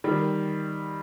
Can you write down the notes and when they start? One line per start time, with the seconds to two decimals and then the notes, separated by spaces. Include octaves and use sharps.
0.04 D#3 G3